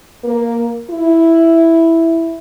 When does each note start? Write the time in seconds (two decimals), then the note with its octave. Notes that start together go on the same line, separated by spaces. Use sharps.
0.24 A#3
0.90 E4